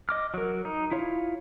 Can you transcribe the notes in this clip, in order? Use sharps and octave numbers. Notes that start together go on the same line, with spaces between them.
D#5 D6 F6
F#3 A#4
D#4
E4 F4 C#5